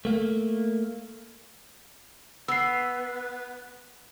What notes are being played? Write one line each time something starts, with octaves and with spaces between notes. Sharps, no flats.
A3 A#3
B3 E6 C7